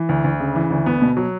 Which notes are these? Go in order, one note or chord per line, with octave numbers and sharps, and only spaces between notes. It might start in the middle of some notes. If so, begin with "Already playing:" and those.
Already playing: E3
D2
D2
C#3
E3
D2
B3
B2
F#3